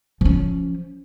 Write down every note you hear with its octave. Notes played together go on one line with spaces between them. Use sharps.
F3 C#4